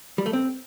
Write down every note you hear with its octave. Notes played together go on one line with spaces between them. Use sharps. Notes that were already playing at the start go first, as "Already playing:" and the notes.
G3
A3
C4